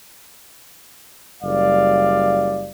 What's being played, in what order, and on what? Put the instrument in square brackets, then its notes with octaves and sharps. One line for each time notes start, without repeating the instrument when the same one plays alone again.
[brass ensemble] F#1 G3 D5 F5